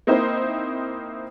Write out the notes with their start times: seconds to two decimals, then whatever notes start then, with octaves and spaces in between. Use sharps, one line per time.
0.07 A#3 C4 D#4 E4 C5